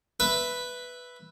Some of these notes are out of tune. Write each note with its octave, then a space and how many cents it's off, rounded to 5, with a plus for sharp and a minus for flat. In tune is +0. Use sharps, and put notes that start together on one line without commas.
B4 +0 E5 +0